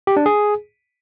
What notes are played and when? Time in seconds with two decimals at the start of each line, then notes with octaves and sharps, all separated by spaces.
0.07 G4
0.17 D4
0.26 G#4